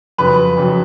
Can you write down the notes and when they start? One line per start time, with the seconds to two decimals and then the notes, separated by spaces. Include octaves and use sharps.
0.18 F2 C#3 F#3 B4
0.57 F2 C#3 F#3